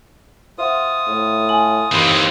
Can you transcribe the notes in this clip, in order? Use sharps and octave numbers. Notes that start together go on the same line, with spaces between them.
F4 C5 E5 F#5 D#6
A2
G#5 F#7
D#2 E3 C4 B5 C6